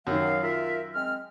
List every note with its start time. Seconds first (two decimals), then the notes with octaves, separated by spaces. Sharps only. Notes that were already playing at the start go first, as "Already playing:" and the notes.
0.07 F#2 D#3 F#3 F5
0.42 F4 A#4 E5
0.94 G#3 C4 F6